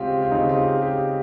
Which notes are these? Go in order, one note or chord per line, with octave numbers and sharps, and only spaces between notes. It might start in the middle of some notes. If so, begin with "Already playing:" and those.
Already playing: C#3 G#3 C4 F4 G4
F4
C#3 G#3 C4 D#4
F4
G4
G4